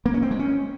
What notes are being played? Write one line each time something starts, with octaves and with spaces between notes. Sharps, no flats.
A#3
C#4
C4
G#3
C#4